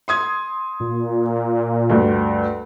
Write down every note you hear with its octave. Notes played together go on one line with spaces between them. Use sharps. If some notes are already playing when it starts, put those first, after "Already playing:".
C6 D#6 G#6
A#2
D2 G2